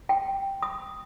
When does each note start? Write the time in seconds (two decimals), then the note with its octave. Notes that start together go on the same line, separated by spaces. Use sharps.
0.09 G5
0.62 D#6